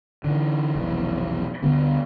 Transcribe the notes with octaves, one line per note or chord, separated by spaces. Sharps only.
D3 E3
F1 B1 E3
D2 D3 G3 B3